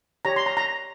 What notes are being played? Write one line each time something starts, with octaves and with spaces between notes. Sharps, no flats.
G4 C#5 A#5
C6
A#5
A#5